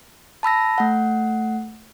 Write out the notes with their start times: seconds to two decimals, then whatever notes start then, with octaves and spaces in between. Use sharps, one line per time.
0.43 A5 B5 E6 A#6
0.78 A3 F#5